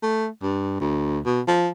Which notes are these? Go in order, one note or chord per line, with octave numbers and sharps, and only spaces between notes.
A3
G2
D2
B2
F3